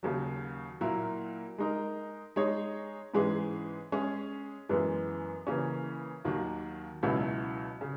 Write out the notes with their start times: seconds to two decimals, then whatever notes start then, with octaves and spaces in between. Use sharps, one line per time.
0.03 D#2 C#3 F#3
0.81 A#2 F#3 A#3 E4 A#4
1.58 G#3 D#4 A#4
2.36 G#3 D#4 G#4 C#5
3.14 G#2 E3 G#3 C#4 G#4
3.92 G#3 C#4 G#4
4.69 F#2 E3 G#3 B3
5.47 C#3 E3 A#3 C#4
6.25 D#2 D#3 F#3 A#3
7.03 C#2 B2 F#3 C#4 E4
7.81 C#3